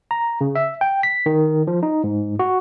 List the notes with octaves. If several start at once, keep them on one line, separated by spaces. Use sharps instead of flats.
A#5
C#3
E5
G5
B6
D#3
F3
D#4
G#2
F#4